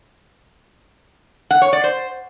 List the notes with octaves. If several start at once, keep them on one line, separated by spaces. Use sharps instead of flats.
F#5
C#5
D5
C5